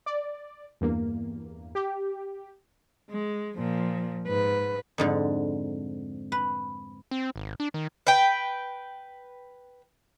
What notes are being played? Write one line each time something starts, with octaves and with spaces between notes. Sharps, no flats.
D5
E2 G2 A#3
G4
G#3
A#2 F3
G#2 B4
F2 G#2 D3
B4
C4
G#1
D4
D#3
B4 G5